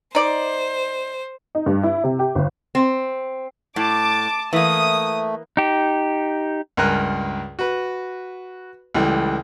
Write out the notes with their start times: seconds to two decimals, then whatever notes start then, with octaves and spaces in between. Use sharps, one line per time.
0.15 D#4 C5 D5
1.55 D#4
1.66 G2
1.83 E4
2.04 C3
2.19 G4
2.35 G1
2.75 C4
3.76 A2 A5 D6
4.53 E3 A3 A#3 D#6
5.57 D#4 G4
6.77 C#2 G2 A#4 G#5 A#5 F#6
7.59 F#4 B4
8.94 C#2 E3 G3 A3